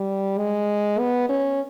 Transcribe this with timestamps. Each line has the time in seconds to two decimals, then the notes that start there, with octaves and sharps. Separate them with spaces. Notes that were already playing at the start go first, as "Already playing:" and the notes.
Already playing: G3
0.38 G#3
0.99 B3
1.29 C#4